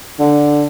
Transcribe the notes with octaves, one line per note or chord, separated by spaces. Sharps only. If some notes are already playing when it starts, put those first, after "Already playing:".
D3